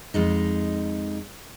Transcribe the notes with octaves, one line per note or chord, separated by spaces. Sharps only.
F2 G#3 D#4